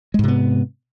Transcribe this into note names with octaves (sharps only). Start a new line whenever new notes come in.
G#2 C3 G#3 B3